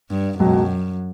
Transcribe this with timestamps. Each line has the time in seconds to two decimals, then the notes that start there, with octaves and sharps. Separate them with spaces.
0.10 G2
0.39 C#2 F#2 B2 F#3